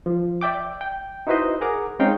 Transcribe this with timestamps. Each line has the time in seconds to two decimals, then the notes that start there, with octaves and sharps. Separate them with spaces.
0.06 F3
0.41 D5 E5 G5 D6
0.81 G5
1.27 D#4 E4 F#4 B4 C5 D#5
1.61 G#4 A#4 F#5 A#5 D6
1.99 G#3 C4 C#4 D#4 F5 G5